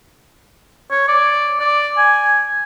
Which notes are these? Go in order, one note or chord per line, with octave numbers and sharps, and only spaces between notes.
C#5
D5
D5
G#5